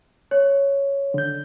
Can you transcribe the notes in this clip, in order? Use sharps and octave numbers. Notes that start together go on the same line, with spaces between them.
C#5
D3 G6